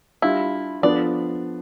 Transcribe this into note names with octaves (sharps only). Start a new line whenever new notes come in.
G3 D4 E4 F4
F3 B3 D4 A4 D5